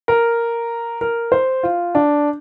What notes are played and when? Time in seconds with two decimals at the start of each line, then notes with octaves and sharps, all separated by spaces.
0.08 A#4
1.01 A#4
1.32 C5
1.63 F4
1.95 D4